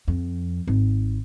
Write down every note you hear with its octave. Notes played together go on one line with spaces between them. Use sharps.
F2
G#1